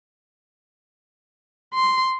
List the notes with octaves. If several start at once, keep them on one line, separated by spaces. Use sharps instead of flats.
C6